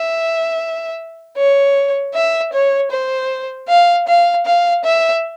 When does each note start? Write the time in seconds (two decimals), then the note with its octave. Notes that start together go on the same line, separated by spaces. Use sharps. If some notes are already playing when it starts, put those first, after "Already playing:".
Already playing: E5
1.37 C#5
2.14 E5
2.53 C#5
2.91 C5
3.69 F5
4.08 F5
4.46 F5
4.85 E5